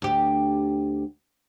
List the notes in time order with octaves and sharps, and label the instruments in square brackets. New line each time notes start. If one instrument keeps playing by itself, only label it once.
[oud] D2 G4